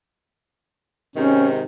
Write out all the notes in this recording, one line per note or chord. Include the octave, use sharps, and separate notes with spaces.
G#2 C3 D#3 C#4